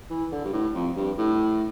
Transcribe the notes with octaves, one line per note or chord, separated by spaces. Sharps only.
E3
D3
G2
A2
F2
G2
A2